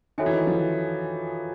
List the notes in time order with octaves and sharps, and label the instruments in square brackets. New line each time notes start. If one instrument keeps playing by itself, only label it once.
[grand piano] D#3 [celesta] F#4 A4 C#5 E5 G#5
[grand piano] E3
D#3
F3